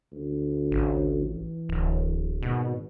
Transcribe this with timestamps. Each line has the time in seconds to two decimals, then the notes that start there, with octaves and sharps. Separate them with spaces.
0.12 D2
0.71 A1
1.22 E3
1.69 D1
2.42 G#1 B2